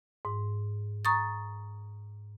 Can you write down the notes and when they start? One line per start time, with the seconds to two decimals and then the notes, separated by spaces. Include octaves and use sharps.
0.25 G#2
1.05 A#5 C#6 D#6 A6